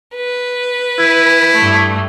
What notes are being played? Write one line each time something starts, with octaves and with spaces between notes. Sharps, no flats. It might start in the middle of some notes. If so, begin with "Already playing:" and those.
B4
E4
G2 A3